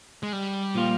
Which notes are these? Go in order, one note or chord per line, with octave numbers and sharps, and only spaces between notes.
G#3
G3
A#2 F3 A#3 F4